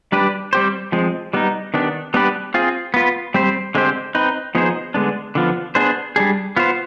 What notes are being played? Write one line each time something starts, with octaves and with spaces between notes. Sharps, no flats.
G3 D4 G4 B4
G3 C4 G4 C5
F3 G#3 C4
G3 B3 D#4
D#3 B3 D4 G4
G3 B3 D4 G4 B4
C4 F4 G#4
B3 F4 B4
G3 C4 G4 C5
D3 G#3 C4 G4 C5
C4 D#4 B4
F3 B3 D#4 G#4 C5
D3 G#3 B3 D4
D3 F3 B3 F4
B3 D4 G#4 C5
G3 D4 G#4
B3 F4 C5